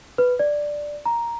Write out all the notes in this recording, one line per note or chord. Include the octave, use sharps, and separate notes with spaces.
B4
D5
A#5